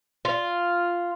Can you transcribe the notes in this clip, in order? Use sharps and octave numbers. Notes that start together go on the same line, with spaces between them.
F4